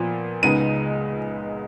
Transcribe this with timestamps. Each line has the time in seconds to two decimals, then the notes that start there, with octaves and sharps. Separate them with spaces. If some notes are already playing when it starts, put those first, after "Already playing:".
Already playing: A#2 F3 B3
0.42 C#2 C#3 G#3 B3 D#4 D#7